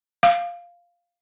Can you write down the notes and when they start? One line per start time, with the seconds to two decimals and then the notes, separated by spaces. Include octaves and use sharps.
0.23 F5